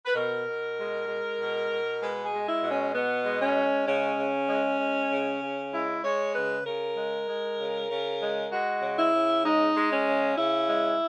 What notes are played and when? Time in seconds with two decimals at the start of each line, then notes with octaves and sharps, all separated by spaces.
0.06 B4
0.15 B2 A#4
0.46 B2
0.77 G#3
1.08 G#3
1.39 B2
1.70 B2
2.01 G#3 B4
2.24 G#4
2.33 G#3
2.47 E4
2.63 B2
2.70 C#4
2.94 B2 B3
3.25 G#3
3.41 C#4
3.57 G#3
3.88 C#3 C#4
4.17 C#3
4.49 G#3
4.80 G#3
5.11 C#3
5.42 C#3
5.73 G#3 E4
6.04 G#3 C#5
6.34 C#3 B4
6.65 C#3 A#4
6.97 G#3
7.28 G#3
7.58 C#3
7.90 C#3
8.21 G#3
8.51 G#3 F#4
8.82 C#3
8.99 E4
9.13 C#3
9.45 G#3 D#4
9.75 G#3
9.91 C#4
10.07 C#3
10.37 C#3 E4
10.69 G#3